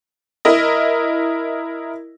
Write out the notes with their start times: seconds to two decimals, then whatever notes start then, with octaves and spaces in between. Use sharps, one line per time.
0.45 E4 A#4 D#5